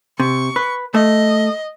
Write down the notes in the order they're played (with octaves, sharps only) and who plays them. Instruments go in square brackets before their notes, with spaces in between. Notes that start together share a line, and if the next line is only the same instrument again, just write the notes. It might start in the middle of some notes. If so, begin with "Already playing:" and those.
[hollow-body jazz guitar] C3 [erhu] C#6
[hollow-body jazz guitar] B4
[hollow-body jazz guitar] A3 [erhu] D#5